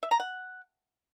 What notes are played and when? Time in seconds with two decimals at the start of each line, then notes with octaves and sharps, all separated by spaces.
0.03 E5
0.11 A#5
0.20 F#5